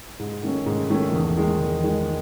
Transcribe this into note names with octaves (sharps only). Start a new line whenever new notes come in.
G#2
D#3 A3 C#4
G#2
D#3 A3 C#4
E2
D#3 G#3
E2
D#3 G#3